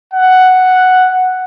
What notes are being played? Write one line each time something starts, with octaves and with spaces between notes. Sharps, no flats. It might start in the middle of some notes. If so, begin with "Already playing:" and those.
F#5